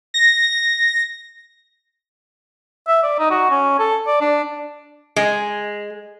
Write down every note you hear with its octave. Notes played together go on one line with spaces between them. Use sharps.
A#6
E5
D5
D#4
F#4
C#4
A4
D5
D4
G#3